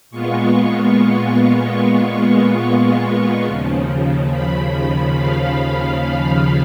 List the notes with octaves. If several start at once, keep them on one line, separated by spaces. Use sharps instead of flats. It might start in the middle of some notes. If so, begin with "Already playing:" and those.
A#2 G#3 B3 F4 C#6
C#6
D#2 C#3 F3
B5
F5
F5